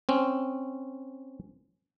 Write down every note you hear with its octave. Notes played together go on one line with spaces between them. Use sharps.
C4 C#4